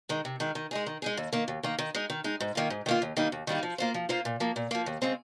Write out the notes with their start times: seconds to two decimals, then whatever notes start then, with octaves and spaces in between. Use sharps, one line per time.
0.09 D#3 G#3
0.25 C3
0.40 D#3 G#3
0.55 D#3
0.71 G#3 D#4 G#4
0.86 D#3
1.02 G#3 D#4 G#4
1.17 D#2
1.33 D#3 A#3
1.48 D#2
1.63 D#3 A#3
1.78 D#3
1.95 G#3 D#4
2.10 D#3
2.24 G#3 D#4
2.40 G#2
2.55 D#3 A#3 F4
2.70 G#2
2.86 D#3 A#3 F4
3.02 D#2
3.17 D#3 G3 A#3 D#4
3.32 D#2
3.47 D#3 G3 A#3 D#4
3.63 F3
3.78 A#3 F4 C5
3.94 F3
4.09 A#3 F4 C5
4.25 A#2
4.40 F3 A#3
4.56 A#2
4.71 F3 A#3
4.86 D#2
5.02 C#3 G#3 C4